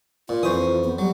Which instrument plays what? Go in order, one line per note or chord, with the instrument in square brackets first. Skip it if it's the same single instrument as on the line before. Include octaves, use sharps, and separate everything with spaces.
[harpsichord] A#2 [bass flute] F4
[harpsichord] F2 C#6 D#6 [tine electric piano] E3 C5
[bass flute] B3
[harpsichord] F#3 [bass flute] G3